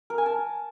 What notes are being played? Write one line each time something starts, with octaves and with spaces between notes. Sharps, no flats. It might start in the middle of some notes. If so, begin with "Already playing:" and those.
A#4
G#5
A5